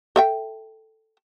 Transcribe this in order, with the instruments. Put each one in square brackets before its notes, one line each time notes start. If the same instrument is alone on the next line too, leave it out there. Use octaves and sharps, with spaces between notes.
[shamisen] A4 E5 G5